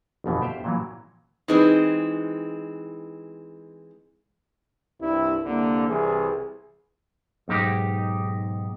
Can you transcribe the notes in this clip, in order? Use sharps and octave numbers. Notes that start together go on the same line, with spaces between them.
G1 F2 B2 E3
G4 C5 E5 F5 G5
A#2 E3 F#3
E3 G#3 C4 D#4 E4 B4
C2 G2 E4
C2 D3 A#3
C2 E3 G#4
B1 G#2 D#4 G4